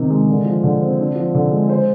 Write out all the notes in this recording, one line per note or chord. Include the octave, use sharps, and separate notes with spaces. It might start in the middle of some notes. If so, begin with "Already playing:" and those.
Already playing: C3 D#3 D#4
G#3
D3
F3
D3
C4
D4
F3
D3
G#3
C5